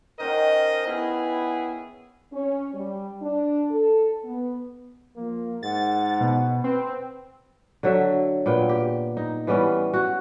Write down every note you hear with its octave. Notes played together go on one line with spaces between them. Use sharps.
D#3 C#4 A#4 C5 D#5 F#5
B3 E4 G#4
C#4
G3
D4
A4
B3
F3 A#3
G#2 F#5 A6
B2
C4 B4
D3 F#3 E5
A#2 B3 G5
G4
D#4
E3 G3 B3 C#4
F#4